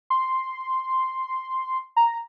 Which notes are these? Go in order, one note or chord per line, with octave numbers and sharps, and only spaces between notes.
C6
A#5